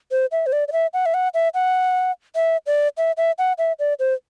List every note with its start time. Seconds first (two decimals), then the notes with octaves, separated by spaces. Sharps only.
0.12 C5
0.32 E5
0.46 C5
0.52 D5
0.68 D5
0.72 E5
0.94 F#5
1.06 E5
1.14 F#5
1.34 E5
1.54 F#5
2.36 E5
2.67 D5
2.97 E5
3.17 E5
3.38 F#5
3.58 E5
3.79 D5
3.99 C5